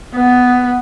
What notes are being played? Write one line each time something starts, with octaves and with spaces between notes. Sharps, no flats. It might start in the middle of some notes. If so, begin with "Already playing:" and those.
B3